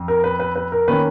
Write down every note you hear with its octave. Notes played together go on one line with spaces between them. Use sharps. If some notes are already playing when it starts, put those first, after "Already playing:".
Already playing: F2
A#4
B4
B4
B4
A#4
D#3 A#3 C#4 B4